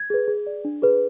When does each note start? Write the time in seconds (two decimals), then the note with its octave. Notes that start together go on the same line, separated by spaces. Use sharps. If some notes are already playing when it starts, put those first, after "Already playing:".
Already playing: G#6
0.10 G#4 B4
0.28 G#4
0.46 D5
0.65 D4
0.82 G#4 B4